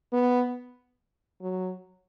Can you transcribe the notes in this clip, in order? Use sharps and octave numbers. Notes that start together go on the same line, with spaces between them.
B3
F#3